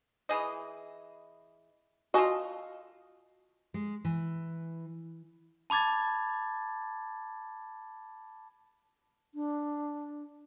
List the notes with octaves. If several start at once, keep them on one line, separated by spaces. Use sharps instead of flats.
E3 G#4 D#5
F4 F#4 A4 D#5 G#5
G#3
E3
A5 B5 D6 G#6 A6
D4